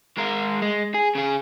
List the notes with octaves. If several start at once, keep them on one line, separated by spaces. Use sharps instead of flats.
G#3 A#4
G#3
G#4
C#3 G#4